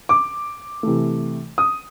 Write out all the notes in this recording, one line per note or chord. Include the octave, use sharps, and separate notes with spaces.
D6
C3 E3 A3
D#6